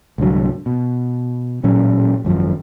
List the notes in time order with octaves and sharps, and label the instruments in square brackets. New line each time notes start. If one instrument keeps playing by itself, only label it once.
[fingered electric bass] C2 G#2 D3 F#3
B2
A1 A#2 F#3 C#4
G#1 F#2 F3